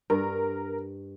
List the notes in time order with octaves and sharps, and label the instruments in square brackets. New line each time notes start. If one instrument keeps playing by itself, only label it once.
[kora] G2 [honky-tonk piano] A#4